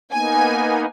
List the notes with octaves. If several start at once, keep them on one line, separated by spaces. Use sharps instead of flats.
A#3 B3 D#4 G#5